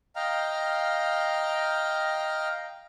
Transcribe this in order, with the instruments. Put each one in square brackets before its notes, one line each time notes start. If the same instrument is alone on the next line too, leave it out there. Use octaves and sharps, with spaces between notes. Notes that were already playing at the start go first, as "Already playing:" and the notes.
[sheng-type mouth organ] D#5 F5 G5 A#5 F6